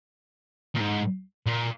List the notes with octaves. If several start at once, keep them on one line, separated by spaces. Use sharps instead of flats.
A#2
G#2
A#2